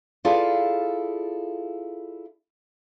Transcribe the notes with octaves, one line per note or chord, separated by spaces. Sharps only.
E4 F4 G#4 A4 D5 F5